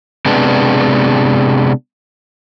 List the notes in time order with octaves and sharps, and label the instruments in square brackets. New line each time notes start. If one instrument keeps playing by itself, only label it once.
[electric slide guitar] C3 G#3 B3 D4